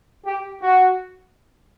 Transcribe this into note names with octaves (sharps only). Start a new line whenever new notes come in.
G4
F#4